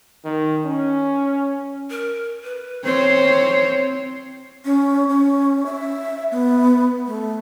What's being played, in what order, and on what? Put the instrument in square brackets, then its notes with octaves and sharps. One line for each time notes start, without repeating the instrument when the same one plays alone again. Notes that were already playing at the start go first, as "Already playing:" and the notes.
[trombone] D#3
C#4
[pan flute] A#4
B4
[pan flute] C4 [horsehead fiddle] C5 C#5
[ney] C#4
C#4
E5
B3
A3